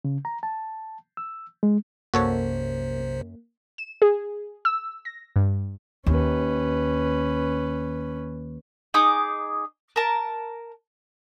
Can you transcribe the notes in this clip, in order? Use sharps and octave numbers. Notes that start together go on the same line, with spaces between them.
C#3
A#5
A5
E6
G#3
B1 F#2 C3 A#3 F#4 A4 C5 C#5
E7
G#4
E6
A#6
G2
D#2 C#4 B4
D#4 G#4 D6 D#6
A#4 A5